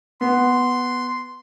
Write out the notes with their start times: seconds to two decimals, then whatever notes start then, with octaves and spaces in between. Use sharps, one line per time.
0.21 B3 C6